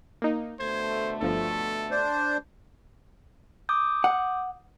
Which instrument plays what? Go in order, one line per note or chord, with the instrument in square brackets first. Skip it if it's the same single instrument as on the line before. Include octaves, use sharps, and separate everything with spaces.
[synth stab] A#3 D#4
[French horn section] B2 D3 A3 [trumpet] C5 [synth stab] G#6
[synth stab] G1 F3 [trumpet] A4
[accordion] D4 C5
[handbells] D6 D#6 G6
[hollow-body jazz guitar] F#5